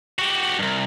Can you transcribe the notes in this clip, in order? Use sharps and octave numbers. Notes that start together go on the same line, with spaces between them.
F#4 G4
C2 G2